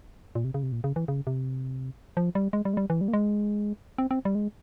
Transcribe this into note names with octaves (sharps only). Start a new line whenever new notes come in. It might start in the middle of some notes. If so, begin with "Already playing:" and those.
A#2
C3
C#3
C3
A#2
C#3
E3
C#3
C3
F3
G3
G#3
G3
G#3
G3
E3
G3
A#3
G#3
C4
C4
G3
G#3